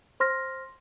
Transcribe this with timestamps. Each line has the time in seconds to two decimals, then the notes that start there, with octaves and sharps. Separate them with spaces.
0.20 C5 C6 F6 A#6